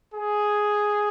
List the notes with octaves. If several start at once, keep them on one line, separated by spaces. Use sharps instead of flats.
G#4